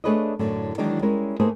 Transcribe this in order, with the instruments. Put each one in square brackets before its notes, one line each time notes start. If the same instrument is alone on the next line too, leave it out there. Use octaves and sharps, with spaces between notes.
[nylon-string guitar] A3 D4 G#4 B4 C#5 D#5
F#2 A2 D3 C#4
D#3 E3 F#3 G#3 D4 D#4
G3 G#3 C#4 E4 A#4
A3 A#3 D#4 G#4 B4 C5